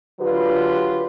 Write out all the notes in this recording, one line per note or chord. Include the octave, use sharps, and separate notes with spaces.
D3 F#3 F4 G4 B4